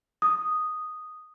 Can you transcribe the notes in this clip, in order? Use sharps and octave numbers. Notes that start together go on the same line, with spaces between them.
D#6